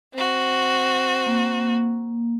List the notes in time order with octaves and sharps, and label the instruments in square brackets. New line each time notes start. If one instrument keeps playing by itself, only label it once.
[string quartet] C4 F#4
[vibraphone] A#3